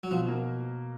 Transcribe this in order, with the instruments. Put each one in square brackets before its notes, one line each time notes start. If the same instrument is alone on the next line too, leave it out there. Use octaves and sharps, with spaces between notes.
[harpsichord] F#3
[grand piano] B2 [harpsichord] F3
[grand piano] A#3